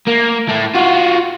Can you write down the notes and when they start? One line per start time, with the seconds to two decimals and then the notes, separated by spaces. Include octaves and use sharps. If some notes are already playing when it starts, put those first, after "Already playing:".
0.07 A#3
0.49 A2 A3
0.75 F4 F#4